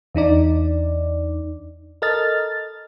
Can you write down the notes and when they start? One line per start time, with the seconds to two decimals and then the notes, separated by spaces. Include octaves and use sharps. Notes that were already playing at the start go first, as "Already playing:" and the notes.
0.15 E2 D4 D#4 D5
2.02 A4 A#4 D#5 F6 A6